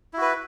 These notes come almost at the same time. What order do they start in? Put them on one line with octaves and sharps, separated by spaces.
E4 F#4 B4